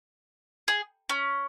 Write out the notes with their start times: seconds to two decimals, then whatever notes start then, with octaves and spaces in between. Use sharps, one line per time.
0.68 G#4
1.09 C#4